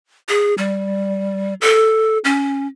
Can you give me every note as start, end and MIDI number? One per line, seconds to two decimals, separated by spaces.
0.29 0.54 68
0.58 1.54 55
1.61 2.18 69
2.24 2.67 61